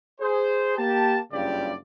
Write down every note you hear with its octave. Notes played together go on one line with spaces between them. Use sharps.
G#4 C5
A#3 G4 A5
F#1 G2 C#3 F4 G4 D5